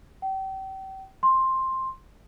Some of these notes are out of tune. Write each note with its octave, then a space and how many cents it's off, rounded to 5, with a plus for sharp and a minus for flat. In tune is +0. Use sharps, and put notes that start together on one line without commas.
G5 -35
C6 +10